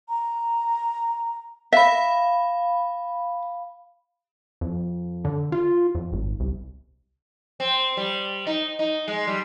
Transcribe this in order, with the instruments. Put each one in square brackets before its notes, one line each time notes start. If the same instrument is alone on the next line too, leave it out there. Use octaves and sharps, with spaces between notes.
[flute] A#5
[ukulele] E5 [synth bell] F5 B5
[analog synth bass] F2
D3
F4
F2
G#1
C2
[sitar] C4
G3
D#4
D#4
G#3
G3